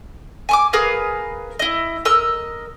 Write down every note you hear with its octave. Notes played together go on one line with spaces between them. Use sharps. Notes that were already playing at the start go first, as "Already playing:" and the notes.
G#5 C#6 D6
G#4 A#4 B4 F5
E4 D#5
A#4 D#5 E6